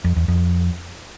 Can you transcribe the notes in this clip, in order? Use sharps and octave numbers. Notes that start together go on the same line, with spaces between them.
F2
E2
F2